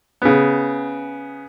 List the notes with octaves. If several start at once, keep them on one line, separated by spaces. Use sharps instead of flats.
C#3 B3